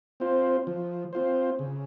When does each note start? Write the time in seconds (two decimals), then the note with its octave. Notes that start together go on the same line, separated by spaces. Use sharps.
0.20 C4 F4 C5
0.67 F3
1.13 C4 F4 C5
1.59 C#3